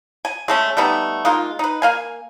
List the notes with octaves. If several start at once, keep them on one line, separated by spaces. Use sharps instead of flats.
G#5
G#3 A3 C#4
G3 A3 B3 D#4
G#3 A#3 D#4 F4
D#4 B4
A#3 F5 G#5